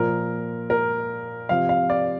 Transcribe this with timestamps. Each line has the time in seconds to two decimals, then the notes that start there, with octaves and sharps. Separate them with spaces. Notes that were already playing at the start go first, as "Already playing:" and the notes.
Already playing: A#2 F3 A#4
0.70 A#4
1.49 C3 F3 F5
1.69 F5
1.90 D5